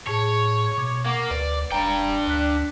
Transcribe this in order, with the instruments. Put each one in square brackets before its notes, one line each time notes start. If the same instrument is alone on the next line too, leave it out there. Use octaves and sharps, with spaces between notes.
[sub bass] A2 [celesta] G#4 A5 [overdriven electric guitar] C#5
[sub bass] B2 [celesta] D6 G#6
[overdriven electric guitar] A#3 [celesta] F#5 D6
[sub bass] D2 [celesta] B4 [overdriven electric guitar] D5
[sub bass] E1 [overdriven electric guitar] D4 G5 [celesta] A#5 B5
[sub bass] D2 [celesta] D5 F#6 B6